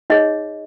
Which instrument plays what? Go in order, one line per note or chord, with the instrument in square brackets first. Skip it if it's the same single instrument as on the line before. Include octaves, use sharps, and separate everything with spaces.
[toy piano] D#4 G#4 C#5 D#5